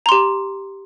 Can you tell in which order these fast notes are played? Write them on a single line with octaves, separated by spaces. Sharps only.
A#5 C6 G4